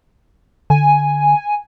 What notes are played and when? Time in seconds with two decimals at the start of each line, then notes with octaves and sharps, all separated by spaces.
0.70 D3 G#5